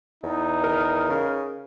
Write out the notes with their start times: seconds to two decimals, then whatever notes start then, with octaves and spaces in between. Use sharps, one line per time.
0.24 E2 D#4
0.64 A#4
1.09 C#3